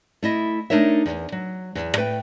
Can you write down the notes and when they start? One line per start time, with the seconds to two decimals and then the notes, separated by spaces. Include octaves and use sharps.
0.23 A3 E4 D#5
0.70 A3 D4 D#4 A#4 C#5 E5
1.06 E2
1.32 F#3
1.75 E2
1.95 A2 A3 B4 G5